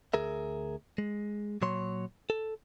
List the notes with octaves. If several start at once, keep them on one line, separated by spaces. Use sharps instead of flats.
D2 G#4 A#4 E5
G#3
A#2 F#3 C#5 C6
A4